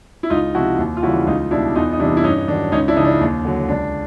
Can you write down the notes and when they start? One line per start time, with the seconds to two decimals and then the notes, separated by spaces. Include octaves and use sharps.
0.23 E4
0.30 C#2 D#4 F4
0.55 C3 F3 E4 F#4
0.78 D#2
0.97 F4
1.03 C#3 E3 G3 E4 F#4
1.27 C#2 D#4 F4
1.51 B2 G3 D4 E4
1.75 E2 D#4 F4
1.93 D#4
1.99 C3 E3 G3 D4 E4
2.17 E4
2.24 G2 C#4 D#4
2.48 D#3 F#3 D4
2.72 C#2 C#4 D#4
2.88 D4 E4
2.96 C#3 F3 D#4
3.04 D4
3.21 D#2
3.45 D3 F#3
3.69 C#2 D4